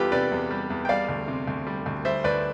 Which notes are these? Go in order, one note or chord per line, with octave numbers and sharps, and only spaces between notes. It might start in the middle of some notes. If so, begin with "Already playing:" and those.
Already playing: E2 G3 F4 G4 A4 B4
C3 B4 D5
E2
G3
E2
G5
G3 D5 F5
D2
C3
D2
G3
D2
G3 C5 E5
D2 B4 D5